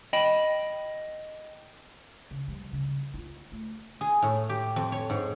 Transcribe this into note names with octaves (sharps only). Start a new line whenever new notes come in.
D#5 G5 B5
C#3
F3 G3
C#3
D#4 F4
A3
G#4
A2
G4
F2
C#5
G#2